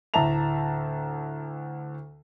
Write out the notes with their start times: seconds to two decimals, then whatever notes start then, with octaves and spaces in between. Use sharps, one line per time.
0.14 D2 A2 E5 A5 A#5 F7